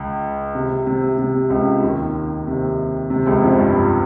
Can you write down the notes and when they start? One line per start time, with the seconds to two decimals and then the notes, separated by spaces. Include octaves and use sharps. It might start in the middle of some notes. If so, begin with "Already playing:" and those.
Already playing: C#2
0.55 C3
0.86 C3
1.18 C3
1.50 C#2 C#3
1.83 D#2 D#3
2.47 C3
3.10 C3
3.26 C#2 C#3
3.42 F2 F3
3.58 G2 G3